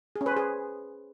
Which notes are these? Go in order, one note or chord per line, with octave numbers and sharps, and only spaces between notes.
G#4
C#4
B4
C5
G#4